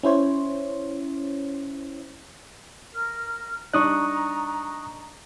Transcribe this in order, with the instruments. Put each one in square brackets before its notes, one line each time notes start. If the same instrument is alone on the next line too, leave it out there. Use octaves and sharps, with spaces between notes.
[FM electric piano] C#4 E4 C5 C#5
[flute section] A#4 F6
[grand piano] G3 D4 D#4 [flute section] A#5 [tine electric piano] C#6 D#6 F#6